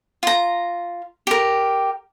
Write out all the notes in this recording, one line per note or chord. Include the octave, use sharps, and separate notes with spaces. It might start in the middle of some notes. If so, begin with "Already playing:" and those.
F4 A#5
G4 A#4